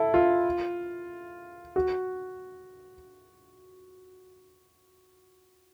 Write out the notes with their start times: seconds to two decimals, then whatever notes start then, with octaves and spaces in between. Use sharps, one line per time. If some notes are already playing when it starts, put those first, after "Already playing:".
Already playing: E4 A4
0.14 F4
1.76 F#4